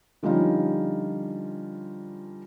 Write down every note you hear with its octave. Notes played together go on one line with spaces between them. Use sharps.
D3 F3 G3 C#4 D#4 F4